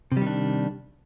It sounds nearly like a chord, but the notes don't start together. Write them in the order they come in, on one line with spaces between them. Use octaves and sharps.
C3 G3 D#3 D4